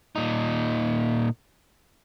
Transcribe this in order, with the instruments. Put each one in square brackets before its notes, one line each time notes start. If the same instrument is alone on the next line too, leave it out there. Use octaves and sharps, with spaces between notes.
[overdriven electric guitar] A#2 D#4